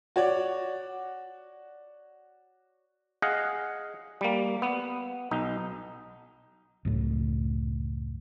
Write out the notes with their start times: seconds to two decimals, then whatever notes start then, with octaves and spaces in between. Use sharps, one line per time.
0.16 F#4 C#5 D5
3.22 G#4 D#5 F5 F#5
4.21 G3 A#3
4.62 B3
5.31 B1 D#4
6.85 C#2 F#2 A2